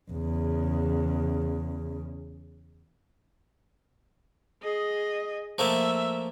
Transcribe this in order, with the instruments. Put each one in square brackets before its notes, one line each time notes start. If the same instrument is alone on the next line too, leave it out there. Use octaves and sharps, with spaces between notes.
[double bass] E2 C#3
[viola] G#4 D#5
[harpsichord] F3 A3 A#3 [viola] E5